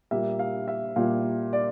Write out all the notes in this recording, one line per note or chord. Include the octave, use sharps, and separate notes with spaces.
A#2 G3 A#3 E5
F5
E5
A#2 G3 A#3 F5
D5